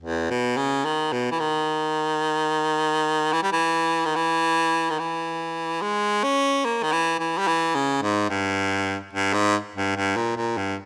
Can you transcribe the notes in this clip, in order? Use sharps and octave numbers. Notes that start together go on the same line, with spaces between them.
E2
B2
C#3
D#3
B2
E3
D#3
E3
G3
E3
D#3
E3
D#3
E3
G#3
C#4
A#3
D#3
E3
E3
G3
E3
C#3
G#2
G2
G2
G#2
G2
G2
A#2
A#2
G2